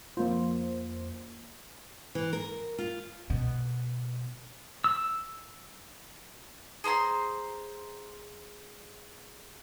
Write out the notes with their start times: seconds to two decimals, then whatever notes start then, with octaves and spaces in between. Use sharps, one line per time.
0.17 F2 A#3 F4 C5
2.15 E3
2.33 A#4
2.78 F4
3.30 B2
4.84 E6
6.84 G#4 C5 A#5 C6